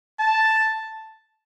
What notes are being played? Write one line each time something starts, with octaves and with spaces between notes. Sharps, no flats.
A5